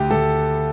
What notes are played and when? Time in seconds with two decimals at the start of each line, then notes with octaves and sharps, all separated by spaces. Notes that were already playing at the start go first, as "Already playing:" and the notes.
Already playing: D2 G4
0.11 D2 A4